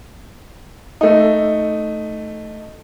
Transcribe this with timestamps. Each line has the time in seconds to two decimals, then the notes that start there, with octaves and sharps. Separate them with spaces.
1.01 A3 D#4